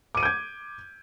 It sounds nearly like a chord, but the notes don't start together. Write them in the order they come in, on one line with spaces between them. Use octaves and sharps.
D6 D#7 D7 G6 G#6